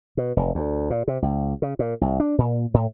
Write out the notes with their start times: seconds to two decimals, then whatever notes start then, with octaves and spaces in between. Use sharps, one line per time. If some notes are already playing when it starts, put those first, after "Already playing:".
0.17 B2
0.37 F1
0.55 D2
0.90 A#2
1.08 C3
1.22 C#2
1.62 C#3
1.79 A#2
2.01 C2
2.20 D4
2.38 A#2
2.74 A2